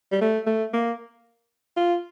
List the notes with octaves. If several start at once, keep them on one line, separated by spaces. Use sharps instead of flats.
G3
A3
A3
A#3
F4